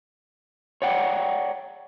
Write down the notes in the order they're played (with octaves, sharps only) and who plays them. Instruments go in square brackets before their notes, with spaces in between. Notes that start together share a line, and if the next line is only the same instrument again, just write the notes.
[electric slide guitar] C#5 D5 F#5 G5